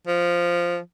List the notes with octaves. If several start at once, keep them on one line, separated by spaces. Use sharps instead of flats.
F3